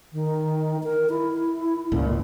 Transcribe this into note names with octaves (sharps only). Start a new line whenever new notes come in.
D#3
A#4
E4
G1 C#2 A#2